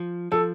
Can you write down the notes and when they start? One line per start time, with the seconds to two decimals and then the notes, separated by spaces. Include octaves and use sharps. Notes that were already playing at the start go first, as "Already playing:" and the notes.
Already playing: F3
0.32 F3 A4